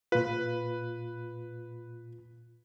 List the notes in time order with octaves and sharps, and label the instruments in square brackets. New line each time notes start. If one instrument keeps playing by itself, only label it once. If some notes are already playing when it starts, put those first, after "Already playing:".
[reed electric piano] A#2 F4 [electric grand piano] B4